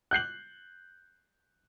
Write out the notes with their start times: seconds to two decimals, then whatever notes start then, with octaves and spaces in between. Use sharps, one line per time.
0.11 F#6 G6 C7 F#7